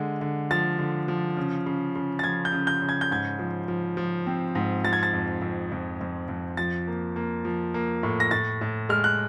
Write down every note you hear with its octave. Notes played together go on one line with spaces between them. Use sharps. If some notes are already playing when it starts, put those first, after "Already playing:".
Already playing: D3 G#3
D3
F3 A6
D3
F3
C#3
C#3
C#3
A6
F3 G#6
G6
C#3
G6
C#3
G#6
G6
G#2 G#6
F3
F3
F3
C4
G#2
F3 A6
G#6
A6
F2
F2
F2
F2
F2
F3 A6
A#3
A#3
F3
A#3
A2
A#6
A2 A6
A2
G#3 F6
F#6